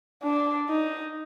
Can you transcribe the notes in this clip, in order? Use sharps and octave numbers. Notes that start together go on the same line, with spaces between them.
D4
D#4